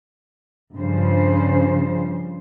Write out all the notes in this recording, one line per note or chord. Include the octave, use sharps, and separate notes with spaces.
G2 C#3 F3 C5